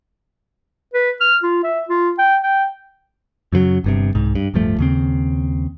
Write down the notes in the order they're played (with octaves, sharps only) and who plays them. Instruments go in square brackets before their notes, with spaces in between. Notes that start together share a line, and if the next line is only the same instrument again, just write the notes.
[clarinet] B4
F6
F4
E5
F4
G5
G5
[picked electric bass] F#2 C#3 F3 F#3
G1 G2 C3
C2 G#2
G2
D1 G2 F3 A3
D#2 C#3 C4